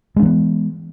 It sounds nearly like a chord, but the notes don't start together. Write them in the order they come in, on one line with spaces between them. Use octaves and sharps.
G#3 C#4 E3 B3